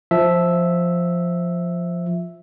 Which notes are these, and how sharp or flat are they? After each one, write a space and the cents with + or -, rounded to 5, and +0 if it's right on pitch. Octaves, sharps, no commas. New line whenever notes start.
F3 +0 E5 +0